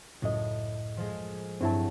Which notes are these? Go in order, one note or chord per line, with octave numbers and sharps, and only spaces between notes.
C#2 F#2 A2 D#5
F3 G#3
G2 F#3 C4 E4 A5